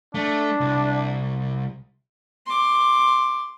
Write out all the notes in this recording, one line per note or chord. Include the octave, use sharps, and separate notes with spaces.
A3 D4
C2
C6 D6